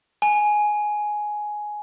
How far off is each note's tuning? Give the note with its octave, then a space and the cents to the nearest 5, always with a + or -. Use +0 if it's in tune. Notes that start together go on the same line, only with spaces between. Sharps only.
G#5 +10